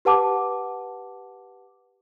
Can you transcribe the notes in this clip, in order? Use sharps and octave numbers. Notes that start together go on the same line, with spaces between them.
G4 B4 F#5 A5 D6